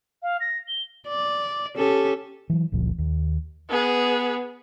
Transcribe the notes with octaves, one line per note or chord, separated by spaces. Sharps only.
F5
A#6
G7
D5
C#4 G4 A4
E3 F#3
F#1 C#2 A#2 F3
D#2
B3 G#4